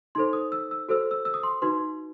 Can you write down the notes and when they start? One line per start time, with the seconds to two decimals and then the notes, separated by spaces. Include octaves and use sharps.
0.15 D#4 A4 C5 C6
0.33 D#6
0.52 E6
0.71 E6
0.89 F#4 A4 C5 E6
1.11 E6
1.25 E6
1.34 D#6
1.43 C6
1.62 D#4 F#4 B4 C6